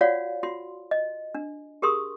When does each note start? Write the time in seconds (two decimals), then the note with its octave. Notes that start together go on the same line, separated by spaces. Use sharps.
0.01 F4 F#4 C#5 D5 F5 F#5
0.43 F4 F#4 C6
0.91 D#5
1.35 D4
1.82 G4 G#4 A#4 C6 C#6 D#6